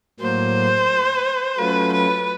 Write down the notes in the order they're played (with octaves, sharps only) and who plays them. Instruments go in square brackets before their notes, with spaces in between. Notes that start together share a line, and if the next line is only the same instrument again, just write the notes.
[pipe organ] A2 F#3 A#3 [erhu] C5
[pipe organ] F#3 A3 C#4 F4 [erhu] B4
[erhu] B4